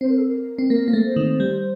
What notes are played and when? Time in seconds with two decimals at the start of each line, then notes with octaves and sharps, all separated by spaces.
0.01 C4 C5
0.08 A#4
0.17 A4
0.26 A#4
0.58 C4
0.70 A#3 A#4
0.88 A#3
0.93 A3
1.05 C5
1.16 D#3
1.40 G3